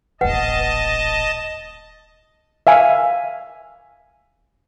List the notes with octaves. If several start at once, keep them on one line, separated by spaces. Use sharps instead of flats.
D#1 A1 B4 D#5 F#5 G5 A5
E5 F5 G#5